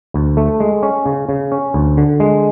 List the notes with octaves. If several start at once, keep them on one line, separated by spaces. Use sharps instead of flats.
D2
A3
G#3
C#4
C#3
C#3
C#4
D2
D3
G#3